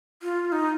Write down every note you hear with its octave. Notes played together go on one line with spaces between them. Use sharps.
F4
D#4